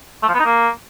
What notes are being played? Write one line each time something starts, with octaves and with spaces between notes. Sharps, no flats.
A3
F3
B3
D#4
A#3